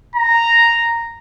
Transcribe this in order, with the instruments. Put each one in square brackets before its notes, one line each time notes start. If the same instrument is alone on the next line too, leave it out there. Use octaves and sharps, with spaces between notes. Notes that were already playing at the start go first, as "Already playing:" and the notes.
[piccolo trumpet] A#5